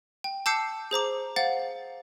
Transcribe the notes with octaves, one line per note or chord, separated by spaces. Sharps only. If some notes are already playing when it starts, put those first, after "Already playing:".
G5
A5 D6 E6 G6 C7 C#7
G#4 C5 A#5 D6
C5 F5 F#5 A6